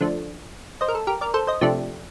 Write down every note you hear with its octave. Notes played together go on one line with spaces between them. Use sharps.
D3 F3 A3 D4
C5 D#5
A#4
A4
G4 A#4
A#4 D5
A4 C5
C5 D#5
C3 F3 A3 D4 G4